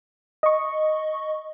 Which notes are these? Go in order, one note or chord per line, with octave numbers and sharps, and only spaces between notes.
D#5 C#6